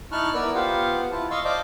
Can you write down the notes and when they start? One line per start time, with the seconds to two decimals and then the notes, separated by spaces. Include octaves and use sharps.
0.12 D#4 E4 A5 C#6 F6 F#6
0.34 B3 E4 A#4 B4 D5 E6
0.55 B3 F4 G4 C5 F5 F#5
1.12 E4 F4 A5
1.31 D#5 F5 C6 C#6 E6
1.45 C5 D5 D#5 F5 A5 D6